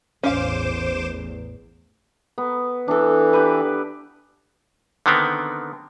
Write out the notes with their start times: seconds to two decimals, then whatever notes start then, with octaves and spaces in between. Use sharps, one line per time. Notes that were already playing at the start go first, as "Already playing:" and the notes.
0.23 A1 E2 C#4 C5 F5 D6 E7
2.38 B3
2.88 E3 D4 A4
3.33 G4 B4
5.06 D3 D#3 B3 C4